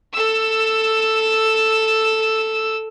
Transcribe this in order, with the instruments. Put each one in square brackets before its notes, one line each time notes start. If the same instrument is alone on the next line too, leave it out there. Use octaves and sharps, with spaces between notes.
[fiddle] A4 E6